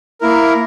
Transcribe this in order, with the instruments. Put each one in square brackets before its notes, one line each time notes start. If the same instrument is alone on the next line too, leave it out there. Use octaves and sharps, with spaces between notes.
[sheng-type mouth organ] A#3 E4 A#4